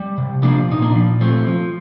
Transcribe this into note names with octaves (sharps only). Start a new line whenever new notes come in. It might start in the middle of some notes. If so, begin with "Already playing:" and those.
Already playing: G3
C3
F3 A#3 D4
A#2 D#4
A#3 D4
F3
F3 A3 C4
F3